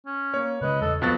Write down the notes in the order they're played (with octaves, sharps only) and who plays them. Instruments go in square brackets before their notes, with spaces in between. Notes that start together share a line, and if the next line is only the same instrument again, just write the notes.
[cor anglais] C#4
[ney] A#3 [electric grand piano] C#5
[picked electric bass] C#3 G#3 [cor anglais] B4 [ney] D#5
[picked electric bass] E2 C#3 [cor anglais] A4
[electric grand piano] F2 B3 A6 [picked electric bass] B2 F#3 A#3 [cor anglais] F#4 [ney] F5